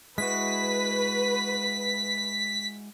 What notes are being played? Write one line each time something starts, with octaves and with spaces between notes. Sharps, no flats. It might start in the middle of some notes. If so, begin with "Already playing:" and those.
G#3 E4 F#4 B4 B6